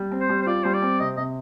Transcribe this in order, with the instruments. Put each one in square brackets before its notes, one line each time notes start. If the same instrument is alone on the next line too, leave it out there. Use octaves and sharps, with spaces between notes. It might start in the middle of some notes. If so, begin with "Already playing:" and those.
Already playing: [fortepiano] G3
C4
[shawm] C5
[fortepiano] G3
[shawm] C5
[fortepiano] F4 [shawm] D5
[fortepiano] G3 [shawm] C5
[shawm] D5
[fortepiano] C4
[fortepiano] C3 [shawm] D#5
[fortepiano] C3 [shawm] D#5